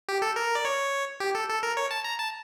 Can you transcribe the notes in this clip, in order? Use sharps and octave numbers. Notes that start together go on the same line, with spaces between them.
G4
A4
A#4
D5
C#5
G4
A4
A4
A#4
C#5
A5
A#5
A5